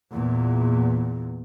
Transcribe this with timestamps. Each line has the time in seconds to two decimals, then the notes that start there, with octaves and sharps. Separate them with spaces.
0.11 E2 A#2